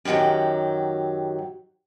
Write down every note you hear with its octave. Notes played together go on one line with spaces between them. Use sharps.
F#2 D3 D#3 F#3 G4